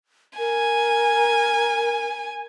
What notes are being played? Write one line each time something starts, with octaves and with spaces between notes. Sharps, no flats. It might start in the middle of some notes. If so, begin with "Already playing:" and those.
A#4 G#5